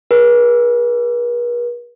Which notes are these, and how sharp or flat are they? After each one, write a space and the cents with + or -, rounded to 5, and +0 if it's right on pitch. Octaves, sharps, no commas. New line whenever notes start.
G#4 +0 B4 -45